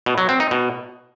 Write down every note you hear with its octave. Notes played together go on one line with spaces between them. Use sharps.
B2
F#3
C4
D#4
B2